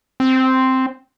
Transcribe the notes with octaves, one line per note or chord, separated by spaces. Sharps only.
C4